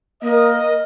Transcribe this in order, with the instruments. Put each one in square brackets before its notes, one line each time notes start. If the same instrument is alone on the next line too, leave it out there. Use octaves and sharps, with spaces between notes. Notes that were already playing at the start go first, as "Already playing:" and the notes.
[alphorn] A#3 [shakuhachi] A#4 [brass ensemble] D#5